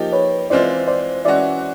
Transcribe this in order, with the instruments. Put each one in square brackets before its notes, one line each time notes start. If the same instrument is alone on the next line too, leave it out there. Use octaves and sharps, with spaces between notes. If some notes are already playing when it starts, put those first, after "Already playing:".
Already playing: [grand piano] F3 A#3 D#4 G4
[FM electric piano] B4 C#5
[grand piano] E3 G#3 C4 F4 [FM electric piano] C5 D5
[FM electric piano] C5 D5
[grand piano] E3 G#3 C#4 F#4 [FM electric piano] D5 E5